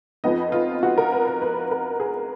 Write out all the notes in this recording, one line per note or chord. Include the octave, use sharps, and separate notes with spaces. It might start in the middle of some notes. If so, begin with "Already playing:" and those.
F2 F3 B3 D#4 D#5
F4
F#4
A#4
B4
B4
B4
A#4
G#4